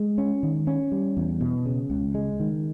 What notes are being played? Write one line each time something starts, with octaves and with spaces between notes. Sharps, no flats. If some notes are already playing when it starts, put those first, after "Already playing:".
Already playing: G#3
C#4
D#3
C#4
G3
E2
B2
C#3
C#2
G#3
D#3